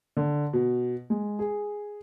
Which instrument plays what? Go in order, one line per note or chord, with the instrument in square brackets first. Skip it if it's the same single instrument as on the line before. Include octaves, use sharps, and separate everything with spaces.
[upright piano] D3
B2
G#3
G#4